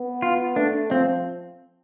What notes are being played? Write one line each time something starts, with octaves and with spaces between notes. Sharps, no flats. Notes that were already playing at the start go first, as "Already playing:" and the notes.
Already playing: B3
F4
A3 D4
F3 C4